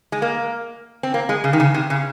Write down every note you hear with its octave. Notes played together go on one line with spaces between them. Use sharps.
G#3
A#3
C4
A#3
G#3
C#3
D#3
C#3
C3
C#3